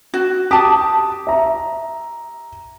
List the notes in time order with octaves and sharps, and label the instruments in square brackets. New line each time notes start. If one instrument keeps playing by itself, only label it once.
[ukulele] F#4
[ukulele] G4 A5 [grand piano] D#6
[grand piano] E5 A#5